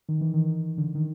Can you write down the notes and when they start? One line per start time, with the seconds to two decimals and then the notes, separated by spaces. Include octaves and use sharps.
0.09 D#3
0.21 E3
0.34 D#3
0.78 D3
0.95 D#3